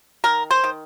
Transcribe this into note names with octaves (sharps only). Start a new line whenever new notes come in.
D#3 A#4
C5
D#3